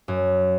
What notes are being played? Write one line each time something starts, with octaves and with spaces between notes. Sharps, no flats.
F#2